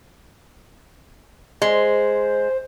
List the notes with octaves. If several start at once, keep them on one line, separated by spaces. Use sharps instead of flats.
G#3 C5